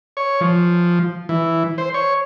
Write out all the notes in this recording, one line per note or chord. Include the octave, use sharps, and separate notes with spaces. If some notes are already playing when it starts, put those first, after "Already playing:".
C#5
F3
E3
C5
C#5